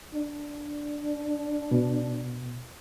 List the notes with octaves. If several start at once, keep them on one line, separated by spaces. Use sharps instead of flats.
D4
B2